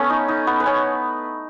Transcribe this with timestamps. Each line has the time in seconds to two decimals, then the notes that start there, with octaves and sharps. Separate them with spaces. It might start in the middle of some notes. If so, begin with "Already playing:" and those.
Already playing: A3 B3 C#4
0.10 D#4
0.28 D#4
0.47 B3 B4
0.60 B4
0.66 C#4 C#5